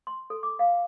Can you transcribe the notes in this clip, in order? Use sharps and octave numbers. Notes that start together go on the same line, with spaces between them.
C6
A4
D6
F5